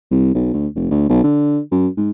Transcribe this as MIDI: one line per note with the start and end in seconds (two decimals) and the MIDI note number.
0.11 0.34 36
0.34 0.50 35
0.54 0.67 38
0.75 0.86 29
0.91 1.05 38
1.09 1.24 35
1.24 1.60 50
1.72 1.88 42
1.97 2.11 44